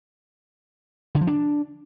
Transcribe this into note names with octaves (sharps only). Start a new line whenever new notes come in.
D3
F3
D4